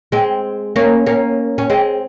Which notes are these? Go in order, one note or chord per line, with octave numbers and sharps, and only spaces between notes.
G#3 C4
A#3 C#4
A#3 C#4
C#4
G#3 C4